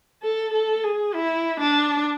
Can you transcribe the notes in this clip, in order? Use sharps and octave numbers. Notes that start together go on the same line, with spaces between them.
A4
A4
G#4
E4
D4